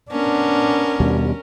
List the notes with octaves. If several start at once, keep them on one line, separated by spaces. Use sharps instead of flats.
B3 C#4 D4 A#4
D#2 B2 G3